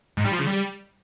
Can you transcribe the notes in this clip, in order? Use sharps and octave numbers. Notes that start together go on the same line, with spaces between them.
G#2
G3
F3
C#3
G3